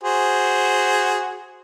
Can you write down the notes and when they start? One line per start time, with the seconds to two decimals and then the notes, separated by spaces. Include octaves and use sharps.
0.03 F#4 G#4 C5